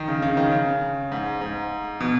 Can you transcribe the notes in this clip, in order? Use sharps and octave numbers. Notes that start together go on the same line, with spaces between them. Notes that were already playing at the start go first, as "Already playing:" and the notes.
Already playing: D#3
C#3
C#3
D#3
C#3
G#2
G#2
B2